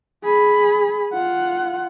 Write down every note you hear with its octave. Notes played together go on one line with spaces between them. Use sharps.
G#4 B5
F4 F#5